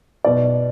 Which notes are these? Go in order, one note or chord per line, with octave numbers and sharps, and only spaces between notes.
B2 D5